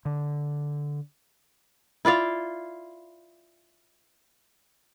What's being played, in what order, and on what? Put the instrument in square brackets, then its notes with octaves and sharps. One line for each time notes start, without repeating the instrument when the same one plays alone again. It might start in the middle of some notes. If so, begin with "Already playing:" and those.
[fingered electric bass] D3
[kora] E4 F4 D5 F5